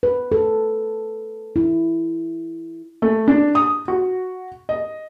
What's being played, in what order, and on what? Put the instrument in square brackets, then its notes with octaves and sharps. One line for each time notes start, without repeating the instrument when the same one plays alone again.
[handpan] B4
A4
E4
[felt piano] A3
D4
D#6
F#4
D#5